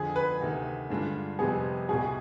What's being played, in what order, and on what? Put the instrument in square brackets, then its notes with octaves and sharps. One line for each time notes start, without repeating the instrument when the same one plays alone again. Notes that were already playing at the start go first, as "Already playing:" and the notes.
Already playing: [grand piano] F2 D3 F3 [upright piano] G#4
[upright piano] B4
[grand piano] D2 C3 D#3
G2 D3 G#3 D4 F4
[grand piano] F2 C3 G3 B3 [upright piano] G#4
[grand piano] C2 B2 G3 [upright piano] G#4